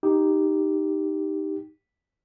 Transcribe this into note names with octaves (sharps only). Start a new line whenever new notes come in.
D#4 G4